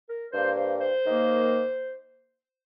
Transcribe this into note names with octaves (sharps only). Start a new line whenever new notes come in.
A#4
G2 G3 A#3 C5
C5
C5
D#2 D#3 A#3